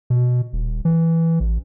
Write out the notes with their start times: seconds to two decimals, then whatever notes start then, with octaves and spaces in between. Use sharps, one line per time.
0.10 B2
0.53 D#1
0.85 E3
1.40 A1